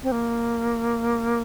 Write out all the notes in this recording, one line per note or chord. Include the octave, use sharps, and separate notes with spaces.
C4
A#3